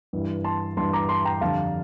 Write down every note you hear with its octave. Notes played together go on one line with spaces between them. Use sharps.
G2 E3 G3
A5 C6
G2 E3 G3 A5 C6
A#5 D6
A5 C6
G5 A#5
F2 D3 G3 F5 A5